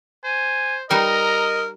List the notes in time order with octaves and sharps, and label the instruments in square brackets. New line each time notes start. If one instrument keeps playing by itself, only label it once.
[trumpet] C5 [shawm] G#5
[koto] G3 D#4 B4 [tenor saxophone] A#4 [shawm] D#5 [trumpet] A#5